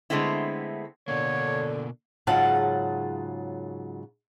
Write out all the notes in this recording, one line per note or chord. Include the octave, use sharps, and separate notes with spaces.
D3 G#3 A3 B3 C4 E4
B2 D3 A#3 C#5
G#2 C#3 F#3 F4 F#5 A5